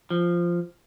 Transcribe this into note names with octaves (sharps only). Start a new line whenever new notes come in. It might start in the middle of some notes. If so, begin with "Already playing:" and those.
F3